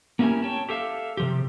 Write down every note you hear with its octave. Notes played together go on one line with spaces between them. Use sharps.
A#3 C#4 E4 G4 A#4 G#5
C#5 G5 A5
G4 A4 E5 F5
C3 F3 G4